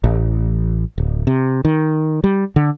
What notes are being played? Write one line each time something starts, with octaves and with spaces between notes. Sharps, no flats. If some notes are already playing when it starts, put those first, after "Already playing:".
A1
D1
C3
D#3
G3
D3